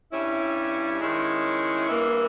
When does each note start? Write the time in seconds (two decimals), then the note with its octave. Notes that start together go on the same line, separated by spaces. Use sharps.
0.12 G2 G3 C#4 E4
0.99 D#3 G#3 C#4 E4
1.87 G2 E3 A#3 E4